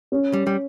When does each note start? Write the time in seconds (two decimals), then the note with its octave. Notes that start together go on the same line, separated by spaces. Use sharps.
0.12 C#4
0.33 G3
0.47 G3